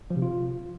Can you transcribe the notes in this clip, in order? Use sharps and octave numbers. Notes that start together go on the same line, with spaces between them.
F3
C3
F4